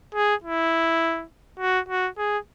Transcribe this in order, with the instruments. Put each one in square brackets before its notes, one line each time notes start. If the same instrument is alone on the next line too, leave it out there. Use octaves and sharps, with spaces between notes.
[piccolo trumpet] G#4
E4
F#4
F#4
G#4